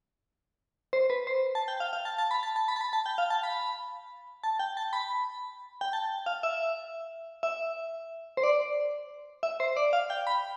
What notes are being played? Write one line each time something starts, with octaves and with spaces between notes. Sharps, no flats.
C5
B4
C5
A5
G5
F5
F5
A5
A5
B5
A5
A5
B5
A5
B5
A5
G5
F5
A5
B5
A5
G5
A5
B5
G5
A5
F5
E5
E5
C5
D5
E5
C5
D5
F5
G5
B5